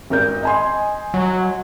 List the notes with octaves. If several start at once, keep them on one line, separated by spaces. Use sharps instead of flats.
G#1 A#4 G6
D#5 G#5 C6
F#3